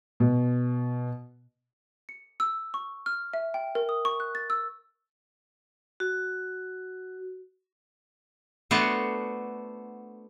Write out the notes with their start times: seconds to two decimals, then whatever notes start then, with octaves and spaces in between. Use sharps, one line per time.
0.20 B2
2.09 C#7
2.40 E6
2.74 C#6
3.06 F6
3.34 E5
3.54 G5
3.75 A#4
3.89 D#6
4.05 C#6
4.20 F#6
4.35 A6
4.50 E6
6.00 F#4
8.71 A3 B3 D4 F#4 C5